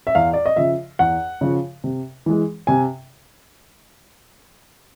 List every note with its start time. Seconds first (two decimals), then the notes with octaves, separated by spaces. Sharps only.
0.07 E5
0.15 E2 F5
0.33 D5
0.46 D#5
0.56 C#3 F3 E5
0.99 E2 F#5
1.41 C#3 F3
1.84 C3
2.26 E3 G#3
2.67 C3 G#5